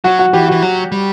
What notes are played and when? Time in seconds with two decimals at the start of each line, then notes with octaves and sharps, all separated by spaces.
0.04 F#3 F#4
0.19 F#4
0.33 E3 G4
0.48 E3 F#4
0.62 F#3
0.92 G3